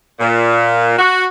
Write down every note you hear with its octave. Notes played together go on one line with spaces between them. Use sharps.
A#2
F#4